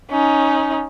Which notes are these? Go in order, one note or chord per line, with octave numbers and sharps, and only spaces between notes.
C#4 D#4